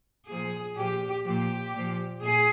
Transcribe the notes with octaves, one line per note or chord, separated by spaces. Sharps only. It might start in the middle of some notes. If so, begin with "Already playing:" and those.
A#2 F3 G#4
A#2 F3 G4
A#2 F3 G4
A#2 F3
A#2 G#4